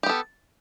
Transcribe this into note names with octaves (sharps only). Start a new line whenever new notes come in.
B3 G4 A4